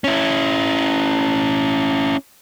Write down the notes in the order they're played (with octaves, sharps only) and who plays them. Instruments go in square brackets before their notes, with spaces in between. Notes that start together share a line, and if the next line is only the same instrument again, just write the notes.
[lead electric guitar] C#4 E4